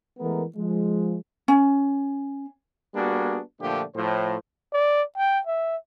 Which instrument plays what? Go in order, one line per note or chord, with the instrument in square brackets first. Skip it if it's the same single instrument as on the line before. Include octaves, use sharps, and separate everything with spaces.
[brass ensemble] E3 G#3 A3 B3 A#4
F3 G#3
[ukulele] C#4
[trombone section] G3 A#3 B3 D4 F#4 G#4
A#2 D3 F3 A3 D4 G4
A2 F3 C5
[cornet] D5
G5
E5